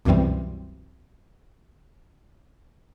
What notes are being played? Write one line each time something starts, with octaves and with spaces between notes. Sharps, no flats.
C2 F#2 B2 E3 G3 C4